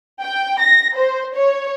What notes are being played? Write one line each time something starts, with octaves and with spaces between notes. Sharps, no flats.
G5
A#6
C5
C#5